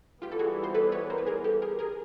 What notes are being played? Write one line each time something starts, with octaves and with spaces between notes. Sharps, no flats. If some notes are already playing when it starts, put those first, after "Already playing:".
E3 G3 B3 F4 G4
A4
F#4 G#4
C5
A4 B4
B4 C#5
A#4 C5
B4
G#4 A#4
G4 A4
G#4 A#4
G#4 A#4